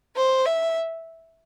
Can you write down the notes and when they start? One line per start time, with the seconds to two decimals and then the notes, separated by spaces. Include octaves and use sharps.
0.16 C5
0.46 E5